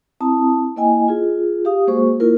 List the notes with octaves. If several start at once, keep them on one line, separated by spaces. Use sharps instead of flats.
C4 E4 A5 A#5 D#6
A#3 E4 D#5 G5 G#5
F4 G#4
G4 F5 D#6
G#3 A#3 F#4 G#4 C5 C#6
A#3 E4 F4 A#4